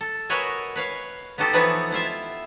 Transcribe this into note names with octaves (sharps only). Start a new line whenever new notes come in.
A4
F#4 A#4 B4 C#5 D#5 G#5
B4 C#5 F5
B3 D#4 F#4 G4 A4
E3 F3 B3 D#4 B4 C#5
B3 E4 F4 E5